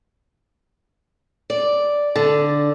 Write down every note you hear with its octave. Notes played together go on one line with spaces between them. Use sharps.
D5
D3